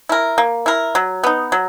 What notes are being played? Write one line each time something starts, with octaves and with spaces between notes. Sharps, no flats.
E4 A#4
A#3
E4 A#4
F#3
B3 D#4
F#3